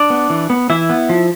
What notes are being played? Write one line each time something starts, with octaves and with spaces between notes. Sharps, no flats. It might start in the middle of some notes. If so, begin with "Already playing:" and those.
Already playing: D4 D5
B3
E3
B3
E3 E4 E5
B3
F3